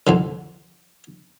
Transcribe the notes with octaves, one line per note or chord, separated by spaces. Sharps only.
C2 F2 D3